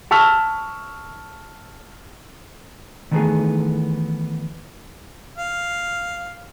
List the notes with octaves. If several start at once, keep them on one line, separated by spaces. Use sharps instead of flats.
A5 C#6 E6 F6 B6 F7
D#3 E3 A3 B3 D#4 G#4
F5